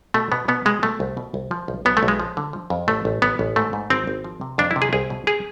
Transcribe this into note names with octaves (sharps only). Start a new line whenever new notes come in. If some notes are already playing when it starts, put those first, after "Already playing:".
B2 A3
B2 B3
B2 B3
B2 G#3
B2 A3
C2
B2
C2
F3
B1
B1 B3
A3
B1
G#3
F3
D3
F3
F2
A1 A3
A1
A1 B3
A1
G#2 A3
G#2
G#1 C4
G#1
F3
C3
F2 D4
E4
C3
G#4
C2 G#4
B2
G#4